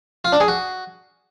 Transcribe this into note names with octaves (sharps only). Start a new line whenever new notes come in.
F4
D4
G#4
F#4